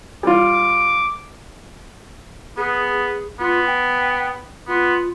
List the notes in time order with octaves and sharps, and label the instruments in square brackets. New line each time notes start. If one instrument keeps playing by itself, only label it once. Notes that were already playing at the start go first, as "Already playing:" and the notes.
[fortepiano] G3 F4 [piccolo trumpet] D6
[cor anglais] B3 [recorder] G#4
[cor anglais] B3 [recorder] F4
[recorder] G5
[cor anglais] B3 [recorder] F4